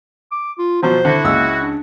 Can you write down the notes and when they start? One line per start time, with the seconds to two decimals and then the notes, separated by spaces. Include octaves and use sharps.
0.32 D6
0.58 F4
0.83 B2 F3 F#3 C5
1.05 D3 E4 F#4
1.24 C#2 G#3 A#3 E6
1.60 D4